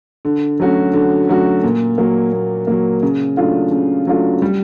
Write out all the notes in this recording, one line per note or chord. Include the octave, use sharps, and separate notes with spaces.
D3
F#3 A3 C#4 F#4
D3
F#3 A3 C#4 F#4
A#2
F#3 A#3
A#2
F#3 A#3
C#3
F#3 A3 D4 F4
C#3
F#3 A3 D4 F4
G3